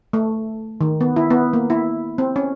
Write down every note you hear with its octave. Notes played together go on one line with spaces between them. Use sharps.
A3
D#3
B3
E4
B3
A#3
E4
C4
C#4